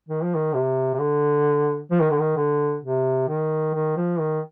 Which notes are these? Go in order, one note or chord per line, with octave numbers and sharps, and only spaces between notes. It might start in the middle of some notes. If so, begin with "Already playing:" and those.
D#3
F3
D#3
C3
C3
D3
F3
D#3
D3
D#3
D3
C3
D#3
D#3
F3
D#3